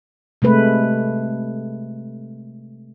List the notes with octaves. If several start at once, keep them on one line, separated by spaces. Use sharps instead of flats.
C3 G#3 A3 B4